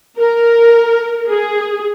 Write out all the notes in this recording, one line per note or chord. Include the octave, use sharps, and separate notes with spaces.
A#4
G#4